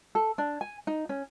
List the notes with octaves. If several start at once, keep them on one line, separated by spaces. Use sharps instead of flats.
A4
D4
G#5
D#4
C#4